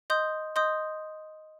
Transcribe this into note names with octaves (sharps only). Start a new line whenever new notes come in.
D#5 C6 D#6 G6
D#5 C6 D#6 G6